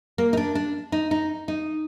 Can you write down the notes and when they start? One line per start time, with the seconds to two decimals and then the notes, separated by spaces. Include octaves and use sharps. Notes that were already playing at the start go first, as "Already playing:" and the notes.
0.18 A#3
0.33 D#4
0.37 D4
0.55 D4
0.92 D#4
1.11 D#4
1.48 D#4